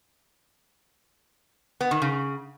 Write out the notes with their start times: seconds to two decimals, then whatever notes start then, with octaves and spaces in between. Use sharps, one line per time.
1.81 B3
1.91 D#3
2.02 C#3